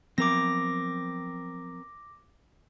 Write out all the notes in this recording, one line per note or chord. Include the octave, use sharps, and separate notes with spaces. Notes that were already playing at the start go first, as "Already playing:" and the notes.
F3 F#3 B3 C4 A#4 D6 A#6